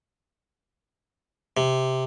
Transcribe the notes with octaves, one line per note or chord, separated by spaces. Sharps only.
C3